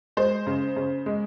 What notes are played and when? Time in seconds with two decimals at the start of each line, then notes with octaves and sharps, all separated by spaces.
0.17 G#3 C5
0.47 C#3
0.76 C#3
1.06 G#3